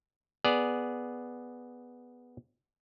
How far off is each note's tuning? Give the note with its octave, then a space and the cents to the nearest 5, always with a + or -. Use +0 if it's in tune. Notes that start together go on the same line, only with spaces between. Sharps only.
B3 +0 G#4 +0 D5 +0